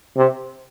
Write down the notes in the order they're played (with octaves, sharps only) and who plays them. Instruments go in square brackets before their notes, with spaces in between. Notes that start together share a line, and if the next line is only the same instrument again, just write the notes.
[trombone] C3